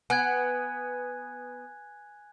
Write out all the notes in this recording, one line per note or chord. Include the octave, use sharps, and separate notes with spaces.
B3 G#5 F#6 G#6